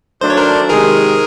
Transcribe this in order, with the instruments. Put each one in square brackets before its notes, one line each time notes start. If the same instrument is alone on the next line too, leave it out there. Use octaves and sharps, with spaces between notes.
[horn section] D#3 F#3 A3 D4 [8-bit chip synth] C5
[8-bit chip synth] C#5
A#4 C5
[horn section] C3 D#3 G#3 [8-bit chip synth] G#4 A#4